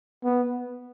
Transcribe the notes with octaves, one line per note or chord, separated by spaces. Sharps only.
B3